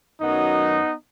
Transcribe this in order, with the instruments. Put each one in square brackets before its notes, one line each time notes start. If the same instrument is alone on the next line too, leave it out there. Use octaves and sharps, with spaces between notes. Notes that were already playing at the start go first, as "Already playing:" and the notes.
[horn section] F#2 D#3 F#3 B3 D#4